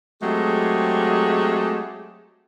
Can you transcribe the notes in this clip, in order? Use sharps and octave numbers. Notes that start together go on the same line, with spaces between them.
F#3 G#3 A3 C4 G4 G#4